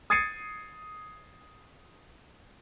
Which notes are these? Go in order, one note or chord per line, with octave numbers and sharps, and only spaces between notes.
D#6 G#6 A6 C7 C#7 D#7